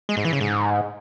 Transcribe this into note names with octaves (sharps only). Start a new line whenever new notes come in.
G#3
G#2
E3
C#3
G#2